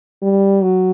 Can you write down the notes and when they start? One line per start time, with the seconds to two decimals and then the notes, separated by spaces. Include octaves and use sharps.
0.22 G3
0.63 F#3